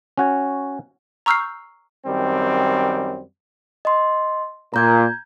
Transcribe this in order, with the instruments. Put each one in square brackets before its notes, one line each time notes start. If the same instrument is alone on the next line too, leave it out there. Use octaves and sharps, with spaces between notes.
[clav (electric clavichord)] C#4 F#4 C#5
[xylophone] A#5 C#6 E6 F6 G6 C7
[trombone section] F#2 D#3 G3 C4
[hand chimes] D#5 C6
[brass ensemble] A#2 [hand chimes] A#5 G6 G#6